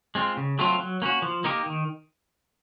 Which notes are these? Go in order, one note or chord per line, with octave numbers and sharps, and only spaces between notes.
G#3 C4 F4
C#3
F#3 A3 C4 F4
F#3
A#3 C#4 F#4
F3
A#3 D#4 G4 A#4
D#3